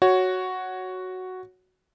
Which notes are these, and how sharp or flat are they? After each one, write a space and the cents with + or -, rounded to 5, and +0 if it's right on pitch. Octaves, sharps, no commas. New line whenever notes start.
F#4 +0 C#5 +0